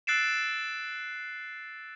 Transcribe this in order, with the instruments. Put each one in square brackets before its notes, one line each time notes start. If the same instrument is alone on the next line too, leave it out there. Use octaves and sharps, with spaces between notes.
[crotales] E6 F#6 A6 C7 D7 E7